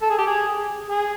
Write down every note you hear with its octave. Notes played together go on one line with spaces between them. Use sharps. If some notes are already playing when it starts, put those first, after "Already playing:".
A4
G#4
G4
G#4
G#4